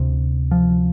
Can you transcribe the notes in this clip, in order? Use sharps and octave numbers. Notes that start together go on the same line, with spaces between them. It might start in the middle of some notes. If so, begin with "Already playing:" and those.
Already playing: D2 C3
F3